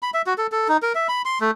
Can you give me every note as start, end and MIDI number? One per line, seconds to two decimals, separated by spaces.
0.02 0.10 83
0.14 0.22 76
0.26 0.34 66
0.38 0.47 69
0.52 0.68 69
0.68 0.77 63
0.83 0.93 70
0.95 1.07 76
1.09 1.22 83
1.25 1.39 84
1.41 1.51 57